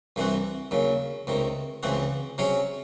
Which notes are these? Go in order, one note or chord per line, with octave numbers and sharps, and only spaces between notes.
C2 C3 E3 C4 F#4
D#2 C#3 F#3
C#2 C3 D#3
C#2 C#3 E3 C4 F#4
C3 F#3 C#4 G#4 C#5